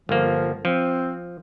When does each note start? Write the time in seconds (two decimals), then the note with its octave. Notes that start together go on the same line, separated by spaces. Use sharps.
0.09 G1 F3 A#3
0.65 F3 C4